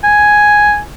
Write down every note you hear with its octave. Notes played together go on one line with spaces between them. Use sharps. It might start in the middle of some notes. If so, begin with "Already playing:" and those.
G#5